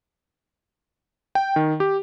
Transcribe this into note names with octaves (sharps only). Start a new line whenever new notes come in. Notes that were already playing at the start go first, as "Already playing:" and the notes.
G5
D#3
G4